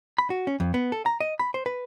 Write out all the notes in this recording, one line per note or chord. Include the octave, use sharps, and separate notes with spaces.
B5
F#4
C#4
F2
B3
A4
A#5
D#5
B5
C5
B4